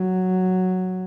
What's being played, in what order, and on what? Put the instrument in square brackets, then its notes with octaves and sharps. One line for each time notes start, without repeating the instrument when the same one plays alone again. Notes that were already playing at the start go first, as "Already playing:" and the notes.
Already playing: [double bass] F#3